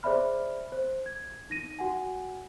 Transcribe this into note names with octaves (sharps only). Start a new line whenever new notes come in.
G#4 C5 D5 E5 B5 F6
C5
G#6
D#4 A#6 D#7
F#4 F#5 G#5